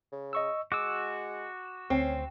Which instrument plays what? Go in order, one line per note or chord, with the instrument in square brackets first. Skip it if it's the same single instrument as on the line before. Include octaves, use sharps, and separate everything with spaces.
[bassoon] C#3
[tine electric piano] D#5 C#6 E6
[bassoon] G#3 [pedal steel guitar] F#4 E6 [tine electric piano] D6
[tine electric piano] D2 [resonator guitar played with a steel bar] C4 [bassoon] C#4